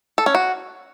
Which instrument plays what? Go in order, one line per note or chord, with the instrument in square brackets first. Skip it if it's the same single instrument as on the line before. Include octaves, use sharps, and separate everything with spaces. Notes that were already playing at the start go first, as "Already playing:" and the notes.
[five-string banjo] A4
C#4
F#4